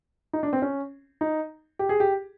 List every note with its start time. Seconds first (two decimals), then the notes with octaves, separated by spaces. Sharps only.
0.33 D#4
0.43 D4
0.53 C4
0.62 C#4
1.21 D#4
1.79 G4
1.89 G#4
2.00 G4